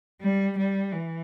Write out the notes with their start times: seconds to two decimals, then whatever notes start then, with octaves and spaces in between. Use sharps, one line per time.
0.21 G3
0.58 G3
0.92 E3